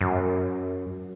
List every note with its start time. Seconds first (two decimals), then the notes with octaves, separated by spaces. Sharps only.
0.01 F#2